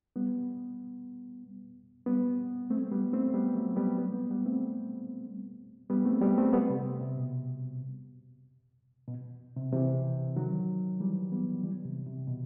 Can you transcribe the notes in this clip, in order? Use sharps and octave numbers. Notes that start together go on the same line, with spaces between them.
G3 B3
G3 B3
A3 C4
G3 B3
A3 C4
G3 B3
F#3 A3
G3 B3
G3 B3
G3 B3
G3 B3
A3 C4
G3 B3
A3 C4
G3 B3
A3 C4
G3 B3
C3
C3
B2
B2
C3
C3 E3
D#3 F#3
E3 G3
G3 B3
E3 G3
C3
C3
B2